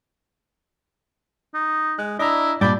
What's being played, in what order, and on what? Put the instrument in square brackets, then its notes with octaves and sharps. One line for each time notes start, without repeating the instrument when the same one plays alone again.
[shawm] D#4
[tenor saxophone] G#3 [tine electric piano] F#6
[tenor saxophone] D4 [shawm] E4 [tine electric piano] D#5 A#5
[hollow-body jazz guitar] G2 A#2 [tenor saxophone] D4 [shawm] D5 [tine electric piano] B5 G6 A6